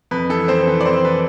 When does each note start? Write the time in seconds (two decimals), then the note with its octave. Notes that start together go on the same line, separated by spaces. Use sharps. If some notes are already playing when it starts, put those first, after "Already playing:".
0.11 F2 B4
0.29 E3 A4
0.48 F2 C4 C5
0.67 E3 B4
0.81 D5
0.85 F2 C4 C5
1.05 E3 B4